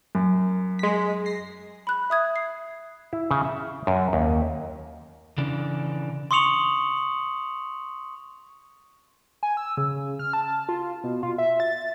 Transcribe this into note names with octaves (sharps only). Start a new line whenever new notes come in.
F#2
G#3 B6
A#6 C7
B5 F#6
E5 D#6 G#6
C7
E4
C#3
E5
F#2
D#2
C#3 E3 D4
C6 C#6 D#6 C#7 F7 F#7
G#5
E6
C#3
F6
A5
F4
B2
F4
E5
A6